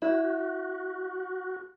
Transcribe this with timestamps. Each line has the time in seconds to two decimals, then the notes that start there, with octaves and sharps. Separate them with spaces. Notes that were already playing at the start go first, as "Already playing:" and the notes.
0.02 E4 F#4